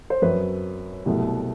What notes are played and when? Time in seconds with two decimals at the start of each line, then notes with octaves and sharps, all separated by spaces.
0.10 C5
0.22 F#2 F#3 C4 B4
1.06 C2 B2 F#3 A3